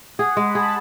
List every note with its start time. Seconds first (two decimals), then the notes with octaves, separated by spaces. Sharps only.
0.19 G#4 F#5
0.37 G#3
0.46 B5
0.55 G#4 A5